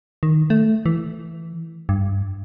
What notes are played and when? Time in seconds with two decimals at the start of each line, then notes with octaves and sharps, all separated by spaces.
0.23 D#3
0.50 A3
0.86 E3
1.89 G2